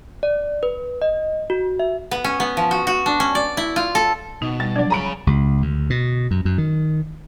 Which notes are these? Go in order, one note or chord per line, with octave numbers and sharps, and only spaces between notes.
D5
B4
D#5
F#4
E5
B3
C#4
B3
F3
F#4
F#4
D4
C#4
D5
E4
F4
A4
B2 D#4
G3 A6
F3 F#3 D4 D5
G#4 C#5 A#5 B5 D7
C#2
D2
B2
F#2
F#2
D#3